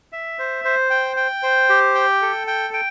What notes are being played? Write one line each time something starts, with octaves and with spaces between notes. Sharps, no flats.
E5
C5
C5
G5
G5
C5
G4
G5
A4
G5
G5